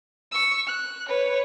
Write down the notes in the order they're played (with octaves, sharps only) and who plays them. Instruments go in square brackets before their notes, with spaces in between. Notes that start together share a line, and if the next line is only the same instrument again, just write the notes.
[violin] C#6 E6
F#6
B4 C#5